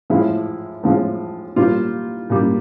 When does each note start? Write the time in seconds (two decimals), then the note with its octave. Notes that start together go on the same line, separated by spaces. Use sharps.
0.10 A2 F3 G#3 E4
0.83 A2 F3 G#3
1.56 A#2 G3 F4
2.30 A#2 G3